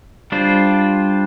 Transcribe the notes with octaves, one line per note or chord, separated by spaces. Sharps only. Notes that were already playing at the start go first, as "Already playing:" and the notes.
G3 D4 F4 C5